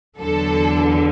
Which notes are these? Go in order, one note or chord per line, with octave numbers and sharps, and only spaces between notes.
E2 D3 F#3 A4